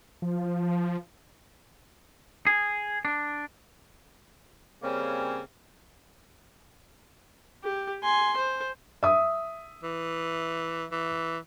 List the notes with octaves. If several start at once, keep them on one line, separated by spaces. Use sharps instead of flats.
F3
G#4
D4
C#3 G3 A#3 C4 C#4
G4
G#5 C6
C5
E5 D#6
E3
E3